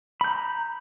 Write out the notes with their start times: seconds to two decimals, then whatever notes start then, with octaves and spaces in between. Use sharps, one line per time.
0.21 B5
0.24 G6
0.28 A#5